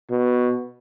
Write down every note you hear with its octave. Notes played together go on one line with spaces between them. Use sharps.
B2